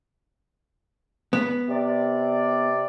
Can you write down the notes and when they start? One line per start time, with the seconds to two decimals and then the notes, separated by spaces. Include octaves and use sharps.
1.33 B3
1.68 C3 D5